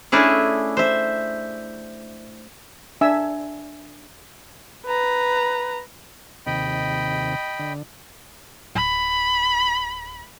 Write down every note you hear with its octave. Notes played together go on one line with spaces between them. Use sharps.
A3 C#4 D4 E4 G#4
C5 E5
D4 E5 G#5 E6
B4 A#5
D#2 C3 D#5 G5 B5
D3
D1 B5